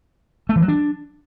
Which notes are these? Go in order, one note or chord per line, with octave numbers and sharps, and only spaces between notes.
A3
E3
F#3
D4